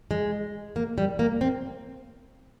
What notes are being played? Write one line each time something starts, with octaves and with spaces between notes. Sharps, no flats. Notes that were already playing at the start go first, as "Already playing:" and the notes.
G#3
A#3
G3
A#3
C4